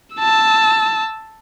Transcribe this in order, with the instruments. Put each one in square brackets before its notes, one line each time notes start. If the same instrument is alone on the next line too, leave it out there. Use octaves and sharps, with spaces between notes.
[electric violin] A5 E6